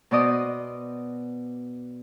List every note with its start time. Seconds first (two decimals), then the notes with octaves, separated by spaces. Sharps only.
0.11 B2 B3 C5 D5 D#5 D#6